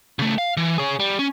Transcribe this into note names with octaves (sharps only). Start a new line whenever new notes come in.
C#3 A3
F5
E3
G#4 C#5
G3
C#4